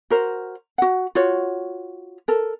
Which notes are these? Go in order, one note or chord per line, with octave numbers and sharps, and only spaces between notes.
F#4 A#4 C5
F#4 F#5
F4 F#4 C#5
A4 A#4